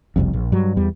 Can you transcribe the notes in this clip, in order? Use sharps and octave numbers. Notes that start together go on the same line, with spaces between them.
F#1 C2 F2
A#1
G2 F#3
E2 G3